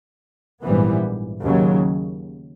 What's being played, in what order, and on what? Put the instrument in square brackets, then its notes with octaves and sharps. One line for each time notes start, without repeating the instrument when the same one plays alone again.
[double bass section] A#1 G#2 E3 G3 B3
D#2 C#3 F#3